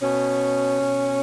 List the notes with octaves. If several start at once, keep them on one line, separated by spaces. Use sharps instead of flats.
B2 C#4
B2